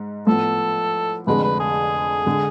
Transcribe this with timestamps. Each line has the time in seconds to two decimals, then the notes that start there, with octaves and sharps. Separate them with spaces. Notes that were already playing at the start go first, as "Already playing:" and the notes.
Already playing: G#2
0.27 A2 F3 B3 A4
1.26 F1 F2 D3 G#3 B4
1.44 B4
1.60 G#4
2.26 D3 G#3